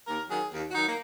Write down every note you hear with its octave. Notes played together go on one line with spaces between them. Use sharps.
D#2 A#4
D#3 F#3 G#4
D#2
F#4
D#3 F#3 D#4
A#3